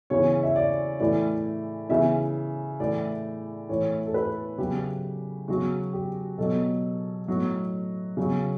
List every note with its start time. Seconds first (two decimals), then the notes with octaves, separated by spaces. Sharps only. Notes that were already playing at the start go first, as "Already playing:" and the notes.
0.10 C#3 E3 C#5
0.43 E5
0.56 D5
1.00 A2 E3 D5
1.89 C#3 E3 E5
2.80 A2 E3 D5
3.69 A2 E3 C#5
4.06 A4
4.14 B4
4.58 C#3 F#3 G4
5.48 C#3 F#3 F#4
5.93 G4
6.38 B2 F#3 A4
7.28 A2 F#3
8.17 C#3 F#3